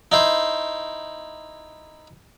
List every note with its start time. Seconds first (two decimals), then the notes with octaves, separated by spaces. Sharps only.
0.12 D#4 E4 C5